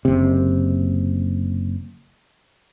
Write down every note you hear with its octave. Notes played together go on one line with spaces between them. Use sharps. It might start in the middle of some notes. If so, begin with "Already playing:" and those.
F#1 C3